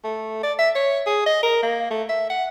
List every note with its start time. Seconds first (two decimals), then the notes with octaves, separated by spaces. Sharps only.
0.04 A3
0.43 D5
0.59 E5
0.75 C#5
1.06 G#4
1.26 D#5
1.43 A#4
1.63 A#3
1.91 A3
2.09 E5
2.30 F#5